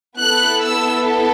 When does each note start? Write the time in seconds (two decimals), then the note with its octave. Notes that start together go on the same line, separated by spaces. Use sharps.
0.18 B3 E4 A4 F#6
0.62 E6